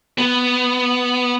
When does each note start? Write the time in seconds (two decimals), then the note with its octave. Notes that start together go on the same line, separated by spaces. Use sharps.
0.18 B3